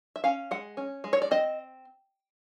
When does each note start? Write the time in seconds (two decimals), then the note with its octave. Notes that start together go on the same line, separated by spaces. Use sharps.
0.16 E5
0.24 C#4 F5
0.51 G#3 F#5
0.77 C#4
1.04 G#3
1.13 C#5
1.22 D5
1.31 C4 D#5